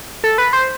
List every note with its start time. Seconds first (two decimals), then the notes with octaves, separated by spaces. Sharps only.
0.24 A4
0.38 B4
0.53 C5